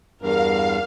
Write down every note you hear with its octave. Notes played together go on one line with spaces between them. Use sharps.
E2 G2 A#4 F5